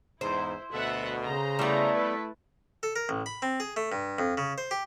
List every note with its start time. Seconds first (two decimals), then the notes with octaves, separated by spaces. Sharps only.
0.21 E2 G#2 E4 C5
0.71 D2 B2 A4 E5 F#5
1.23 C#3 C5 A#5
1.59 G3 A3 B3 E4
1.93 A4 B4
2.83 A4
2.96 A#4
3.09 A1
3.26 B5
3.42 C4
3.60 G#4
3.77 A3
3.92 G2
4.19 F2
4.38 C#3
4.58 C5
4.71 G4